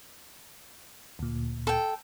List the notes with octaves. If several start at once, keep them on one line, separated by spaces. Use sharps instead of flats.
D2 A#2
A4 G5